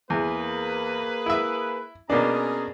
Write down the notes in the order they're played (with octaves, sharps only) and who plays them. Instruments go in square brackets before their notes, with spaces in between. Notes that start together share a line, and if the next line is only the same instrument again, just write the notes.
[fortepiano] E2 [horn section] A#3 G#4 B4
[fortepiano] E4 E5
[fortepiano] B2 A#3 D4 [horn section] C#4 G#4 A#5